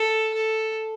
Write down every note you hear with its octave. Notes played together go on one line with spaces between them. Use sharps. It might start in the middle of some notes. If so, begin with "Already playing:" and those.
Already playing: A4
A4